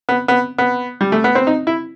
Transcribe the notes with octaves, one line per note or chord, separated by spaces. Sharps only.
B3
B3
B3
G3
A3
B3
C4
D#4
E4